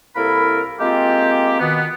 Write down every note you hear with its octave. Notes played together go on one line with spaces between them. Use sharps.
C2 A#3 E4 A4 A#4 B5
G#3 A#3 C4 F4 G4
B2 D#3 B3